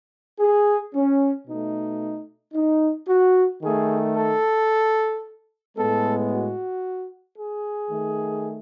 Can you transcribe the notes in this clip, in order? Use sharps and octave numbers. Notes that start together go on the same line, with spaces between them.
G#4
C#4
B2 A3 D#4
D#4
F#4
D#3 A3 G#4
A4
A2 G#3 B3 A4
F#4
G#4
D#3 A3